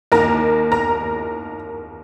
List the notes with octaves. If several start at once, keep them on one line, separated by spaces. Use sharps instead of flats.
D#2 D#3 A#3 A#4 A#5
A#4 A#5